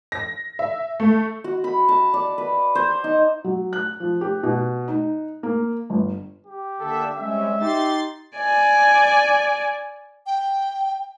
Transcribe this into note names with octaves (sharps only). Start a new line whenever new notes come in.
A#6
E5
A3
F#4
B5
A5
D5
B4
C5
D#4
F#3
F#6
F3
G4
B2
D#4
A#3
G1
G4
D3 A#3 D4 A4 E5
G3 G#3 C4 C#4 E5
D#4 G4 C6 A6
D5 G#5
G5